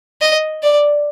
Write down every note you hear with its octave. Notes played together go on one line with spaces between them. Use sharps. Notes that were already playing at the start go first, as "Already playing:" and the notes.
D#5
D5